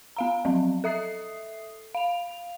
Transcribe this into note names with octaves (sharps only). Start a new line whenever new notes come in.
B3 F5 A#5
F3 F#3 C4
A4 E5 D#6 C7
F5 F7